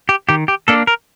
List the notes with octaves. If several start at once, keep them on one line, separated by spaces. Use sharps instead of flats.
G4
D#3 G4
G4
A#3 D4 A4
A#4